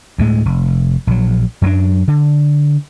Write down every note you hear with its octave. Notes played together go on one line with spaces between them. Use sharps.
D2 A2 G#3
F1
A#1 F#3
F#2 F#3 A#3 D4
D3